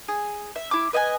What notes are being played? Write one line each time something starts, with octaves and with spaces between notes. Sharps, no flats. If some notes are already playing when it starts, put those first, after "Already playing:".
G#4
E5
E4 D6
B4 D#5 G5 G#5